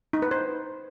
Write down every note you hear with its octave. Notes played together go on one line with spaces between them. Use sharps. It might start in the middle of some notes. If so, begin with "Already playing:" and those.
D#4
B4
C5